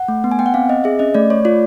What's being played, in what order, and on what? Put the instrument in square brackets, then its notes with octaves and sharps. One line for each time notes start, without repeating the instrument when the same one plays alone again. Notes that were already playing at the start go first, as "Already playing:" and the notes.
Already playing: [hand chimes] F#5
A3
B3
G#5
B3 G5
F#5
C4 F5
C4 D#5
G#4 E5
C#4 D#5
A3 D5
A3 C#5
F4 D5